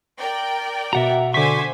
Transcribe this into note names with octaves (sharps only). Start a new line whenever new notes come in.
A#4 D5 G5
B2 F#4 E5 F#5 A#5
D3 C5 E5 G#5 C#6 D6 B6